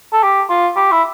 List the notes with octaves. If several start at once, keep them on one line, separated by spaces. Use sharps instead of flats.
A4
G4
F4
G4
E4